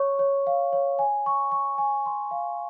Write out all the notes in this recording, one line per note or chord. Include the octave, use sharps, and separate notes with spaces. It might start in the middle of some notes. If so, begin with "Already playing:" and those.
Already playing: C#5 C#6
C#5
F5
C#5
G#5
C#6
C#6
G#5
C6
F5